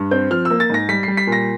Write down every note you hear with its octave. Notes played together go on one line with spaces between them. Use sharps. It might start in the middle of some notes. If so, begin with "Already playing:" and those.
Already playing: G2
C4 G6
F3 F6
E6
A#3
A6
G#2 A#6
G3 B6
G3 C7
B6
A#2
A#6